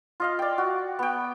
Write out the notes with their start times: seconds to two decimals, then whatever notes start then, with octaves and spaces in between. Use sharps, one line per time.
0.20 F4 D#5 F5
0.39 D5 G5
0.58 F#4
0.99 B3 G5